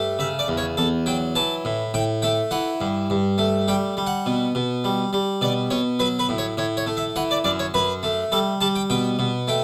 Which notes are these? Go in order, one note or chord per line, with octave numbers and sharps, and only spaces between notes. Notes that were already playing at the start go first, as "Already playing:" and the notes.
Already playing: G2 A3
C#3 E5
D5
E2
C#5
E2 A4
F#3 G5
E3 A5
A2
A2 G5
A3 G5
E3 F#5
G2
G2
A3
G3 G5
G3
F#5
B2
B2
G3
G3
B2 D5
B2 C#5
F#3 B4
B4
A2
C#5
A2 C#5
C#5
A3
E5
E3 F#5
D5
F#2 D5
C#5
F#2 B4
A3
G3 A4
G3 A5
G5
B2 G5
B2
A3 G5